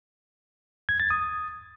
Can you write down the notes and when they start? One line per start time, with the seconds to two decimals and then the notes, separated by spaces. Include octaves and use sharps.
0.89 G#6
1.00 A6
1.10 D#6